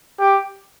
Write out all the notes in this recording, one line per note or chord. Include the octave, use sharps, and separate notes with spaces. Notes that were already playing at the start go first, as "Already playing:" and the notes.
G4